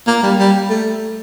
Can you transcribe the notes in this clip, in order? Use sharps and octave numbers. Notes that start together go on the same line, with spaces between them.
A#3
G3
G3
A3